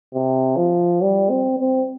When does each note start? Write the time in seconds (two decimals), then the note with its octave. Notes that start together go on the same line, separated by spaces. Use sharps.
0.14 C3
0.57 F3
1.02 G3
1.30 C4
1.59 C4